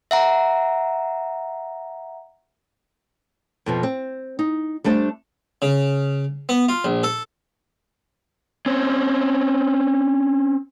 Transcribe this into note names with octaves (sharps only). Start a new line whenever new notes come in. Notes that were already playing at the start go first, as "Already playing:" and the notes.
E5 F#5 A#5
F2 B2 F3
C4
D#4
G3 A3 D4 C5 D5
C#3
B3
F4
A#1
A4
C4 C#4